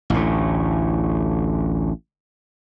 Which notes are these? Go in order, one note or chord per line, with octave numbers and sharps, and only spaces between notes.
A1 D2 A2